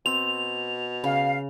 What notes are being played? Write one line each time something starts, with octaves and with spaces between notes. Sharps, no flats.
B2 C4 F7
C#3 F5